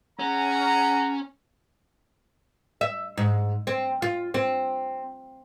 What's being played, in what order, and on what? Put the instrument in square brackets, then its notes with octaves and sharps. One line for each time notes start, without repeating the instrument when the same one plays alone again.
[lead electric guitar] C#4 [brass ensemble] G#4 F#5 A#5
[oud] E5
G#2
C4
F4
C4